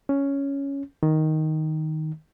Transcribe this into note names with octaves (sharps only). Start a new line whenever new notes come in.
C#4
D#3